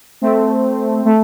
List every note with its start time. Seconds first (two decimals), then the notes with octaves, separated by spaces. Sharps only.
0.22 A3 C4
1.05 A3